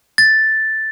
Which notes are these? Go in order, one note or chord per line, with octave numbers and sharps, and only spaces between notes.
A6